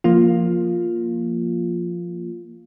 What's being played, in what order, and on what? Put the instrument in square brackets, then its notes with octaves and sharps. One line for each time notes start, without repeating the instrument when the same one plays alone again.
[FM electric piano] F3 A#3 F4